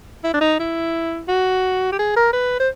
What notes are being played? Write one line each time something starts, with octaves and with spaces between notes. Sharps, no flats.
E4
D4
D#4
E4
F#4
G4
G#4
A#4
B4
C5